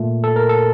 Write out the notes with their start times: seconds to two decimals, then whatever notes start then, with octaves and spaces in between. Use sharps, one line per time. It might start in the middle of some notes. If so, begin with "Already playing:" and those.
Already playing: A#2 A3
0.24 A4
0.36 A#4
0.49 A4